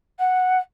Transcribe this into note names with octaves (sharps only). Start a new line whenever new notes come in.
F#5